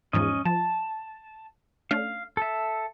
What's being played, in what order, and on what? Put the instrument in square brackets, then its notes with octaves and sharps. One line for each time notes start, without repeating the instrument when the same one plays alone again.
[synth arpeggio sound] E2 G#2 F3 [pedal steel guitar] C#4 D#5
[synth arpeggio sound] F3 [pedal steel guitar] A5
[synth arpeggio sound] A3 C#4 D4 [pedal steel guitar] F5
[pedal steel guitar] A4 E5